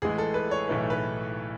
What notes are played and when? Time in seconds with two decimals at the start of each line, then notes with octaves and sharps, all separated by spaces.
0.02 A1 A2 E3 G#3 G#4
0.18 A4
0.34 B4
0.51 C#5
0.68 B1 A2 E3 A3 D#4 B4
0.90 B4